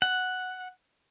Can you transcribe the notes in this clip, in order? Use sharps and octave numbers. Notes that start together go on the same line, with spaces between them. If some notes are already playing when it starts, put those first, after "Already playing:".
F#5